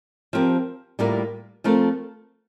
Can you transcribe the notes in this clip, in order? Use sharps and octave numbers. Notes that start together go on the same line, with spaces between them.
F3 C4 G4 A#4
A2 G3 A#3 F4 A#4
F3 A3 C4 F4 A#4